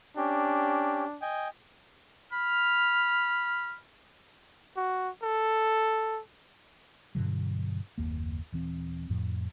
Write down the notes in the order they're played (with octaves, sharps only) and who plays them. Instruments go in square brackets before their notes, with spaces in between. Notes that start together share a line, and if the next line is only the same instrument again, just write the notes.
[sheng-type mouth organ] C#4 G4 [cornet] D4
[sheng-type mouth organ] D#5 G5 G#5
[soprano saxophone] B5 [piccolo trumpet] F6
[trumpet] F#4
A4
[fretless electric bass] G2 B2 D3 F#3
F#1 D#2 A#3
D#1 E3 C4
F2 A2 F3